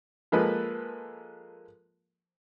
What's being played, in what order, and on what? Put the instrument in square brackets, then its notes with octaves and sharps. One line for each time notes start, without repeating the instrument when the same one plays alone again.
[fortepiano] F3 G#3 A#3 A4 B4